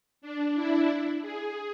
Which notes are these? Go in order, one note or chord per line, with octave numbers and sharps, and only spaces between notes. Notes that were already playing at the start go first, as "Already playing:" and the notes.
D4
E4
G#4